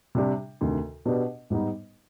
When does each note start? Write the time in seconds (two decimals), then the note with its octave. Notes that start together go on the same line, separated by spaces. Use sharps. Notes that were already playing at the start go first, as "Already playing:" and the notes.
0.15 C3 G3 D4 G4
0.61 D2 C3 D#3
1.05 B2 B3 D4 G4 B4
1.50 G#2 G3 B3 D#4 B4